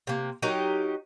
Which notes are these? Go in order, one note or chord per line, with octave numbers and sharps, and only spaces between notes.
C3 A#3
F#3 D#4 G4 A#4